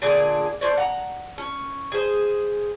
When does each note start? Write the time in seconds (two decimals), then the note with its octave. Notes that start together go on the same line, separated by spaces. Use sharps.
0.02 A#2 D3 G#4 D5
0.61 A2 C5 D5
0.77 F#5 A#5
1.38 C#4
1.92 G#4 C5